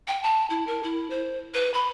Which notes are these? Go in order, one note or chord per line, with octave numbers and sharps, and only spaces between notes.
G5
A5
E4
A#4
E4
C5
B4
B5